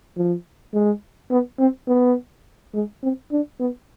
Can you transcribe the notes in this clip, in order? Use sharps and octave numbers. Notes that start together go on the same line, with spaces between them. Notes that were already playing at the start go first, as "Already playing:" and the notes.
F3
G#3
B3
C4
B3
G#3
C4
D4
B3